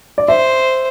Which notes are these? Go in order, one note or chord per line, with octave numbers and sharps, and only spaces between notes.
D5
C5 E5